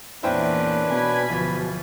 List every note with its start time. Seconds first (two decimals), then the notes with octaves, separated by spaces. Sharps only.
0.23 E2 A#2 C#4 D4 E4 B4 C5 G5
0.89 B2 G#5 B5
1.29 D1 B2 F3